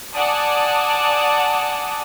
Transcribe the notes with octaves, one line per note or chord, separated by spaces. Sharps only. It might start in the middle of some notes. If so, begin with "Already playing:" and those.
D5 F#5 G#5 A5 D6 D#6